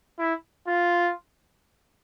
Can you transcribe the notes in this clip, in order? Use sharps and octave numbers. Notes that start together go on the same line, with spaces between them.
E4
F4